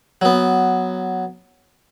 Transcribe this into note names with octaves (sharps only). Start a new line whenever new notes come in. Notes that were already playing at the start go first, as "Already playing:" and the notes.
F#3 B3